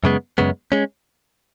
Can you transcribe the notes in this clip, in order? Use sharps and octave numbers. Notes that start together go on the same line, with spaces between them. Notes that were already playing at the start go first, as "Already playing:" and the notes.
F#2 C#3 G#3 B3
F#2 C#3 G#3 B3
G#3 C#4